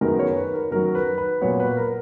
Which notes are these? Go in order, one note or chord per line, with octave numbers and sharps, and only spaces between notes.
F#2 D#3 G#3 B3 A#4
C#5
B4
A#4
F#2 D#3 F#3 A#4
B4
B4
A#2 F#3 B3 C#5
B4
A#4